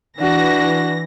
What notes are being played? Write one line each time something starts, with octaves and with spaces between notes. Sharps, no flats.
E3 D4 F#4 A#6